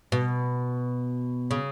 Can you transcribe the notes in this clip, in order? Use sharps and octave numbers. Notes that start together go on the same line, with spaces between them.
B2
C#3